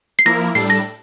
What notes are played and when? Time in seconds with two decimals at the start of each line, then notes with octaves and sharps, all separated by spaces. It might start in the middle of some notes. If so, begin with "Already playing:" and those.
0.19 C7
0.25 F3 A#3 E4 A#4 A#6
0.55 A2 G3 D4 A4 C7
0.70 A#6